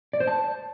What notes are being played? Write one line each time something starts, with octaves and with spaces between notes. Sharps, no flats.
D5
C5
A5